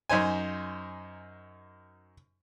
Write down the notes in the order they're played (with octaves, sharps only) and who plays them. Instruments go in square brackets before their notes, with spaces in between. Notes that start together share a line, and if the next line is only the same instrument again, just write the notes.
[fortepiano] F#2 D#4 C5 G#5